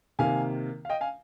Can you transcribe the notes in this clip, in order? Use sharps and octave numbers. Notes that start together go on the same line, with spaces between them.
C3 D#3 A#3 F5 G#5
F5
D#5 G5
F5 G#5